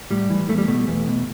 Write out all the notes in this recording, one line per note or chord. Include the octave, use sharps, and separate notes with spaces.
A2 G3
E3
E2 A3
G3
B2 A3
E2
B2